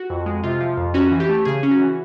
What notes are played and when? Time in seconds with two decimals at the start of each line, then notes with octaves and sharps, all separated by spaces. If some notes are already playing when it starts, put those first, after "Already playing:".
Already playing: F#4
0.10 F2
0.26 G#3
0.43 C3 F4
0.61 F3
0.77 F2
0.94 C#4 F#4
1.11 E3
1.20 G4
1.29 A3
1.45 C#3 G#4
1.63 C#4
1.71 F#4
1.79 E3